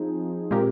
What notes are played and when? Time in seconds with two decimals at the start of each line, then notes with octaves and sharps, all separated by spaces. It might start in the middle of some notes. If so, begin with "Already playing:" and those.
Already playing: F3 C4 D#4 G#4
0.51 A#2 G#3 C4 G4 A#4